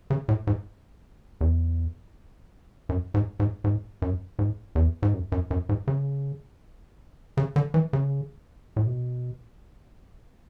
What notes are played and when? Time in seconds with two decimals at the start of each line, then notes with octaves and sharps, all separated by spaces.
0.10 C#3
0.29 A2
0.47 G#2
1.41 E2
2.89 F#2
3.14 G#2
3.40 G#2
3.64 G#2
4.02 F#2
4.39 G#2
4.75 E2
5.03 G#2
5.13 F#2
5.32 F#2
5.51 F#2
5.69 G#2
5.88 C#3
7.37 C#3
7.56 D3
7.74 E3
7.93 C#3
8.76 A2
8.86 B2